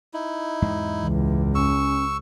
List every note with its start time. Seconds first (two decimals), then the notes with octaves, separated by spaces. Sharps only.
0.13 D#4 E4
0.62 E2 G#2 G#3
1.02 C#2 E3
1.55 C#4 C#6 E6